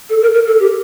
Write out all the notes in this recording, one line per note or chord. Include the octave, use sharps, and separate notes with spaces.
A4
A#4
A#4
A4
G4